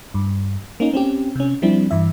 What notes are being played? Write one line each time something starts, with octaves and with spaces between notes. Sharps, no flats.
G2
A#3 C#4 D#4
C4 C#4 G4
C3 C#4
F3 G3 C4 D4 E4
G2 E3 E5